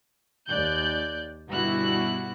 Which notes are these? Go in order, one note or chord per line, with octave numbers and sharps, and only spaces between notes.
D#2 D5 F#6 G6
G1 B2 G3 E4 F#4 F#6